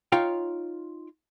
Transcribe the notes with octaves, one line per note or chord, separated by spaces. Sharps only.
D#4 F4 C#5 F5 G5